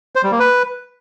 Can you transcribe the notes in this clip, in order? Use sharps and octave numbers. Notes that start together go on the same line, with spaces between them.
C5
G3
A#3
B4